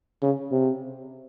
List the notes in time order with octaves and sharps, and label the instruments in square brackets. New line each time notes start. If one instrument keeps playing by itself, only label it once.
[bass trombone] C#3
C3